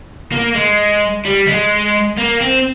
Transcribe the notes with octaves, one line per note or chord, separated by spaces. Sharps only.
A#3
G#3
G3
G#3
A#3
C4